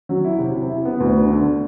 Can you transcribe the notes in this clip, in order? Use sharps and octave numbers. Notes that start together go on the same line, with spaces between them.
F#3
E4
C3
C3
E4
B3
D2
D3
D3